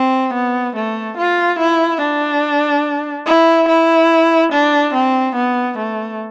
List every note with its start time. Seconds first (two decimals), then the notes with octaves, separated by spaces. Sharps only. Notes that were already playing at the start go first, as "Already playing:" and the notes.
Already playing: C4
0.34 B3
0.76 A3
1.17 F4
1.59 E4
2.01 D4
3.27 E4
3.68 E4
4.53 D4
4.94 C4
5.36 B3
5.78 A3